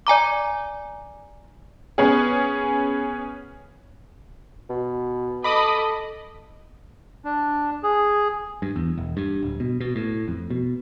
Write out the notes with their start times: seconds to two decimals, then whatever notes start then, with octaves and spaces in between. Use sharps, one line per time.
0.07 D5 G#5 A#5 D6
1.98 B3 C#4 G#4
4.70 B2
5.44 A4 D#5 B5 D6 D#6
7.25 D4
7.83 G#4
8.62 G2
8.76 E2
8.97 E1
9.17 G2
9.43 D1
9.60 B2
9.80 B2
9.96 A2
10.28 F2
10.50 B2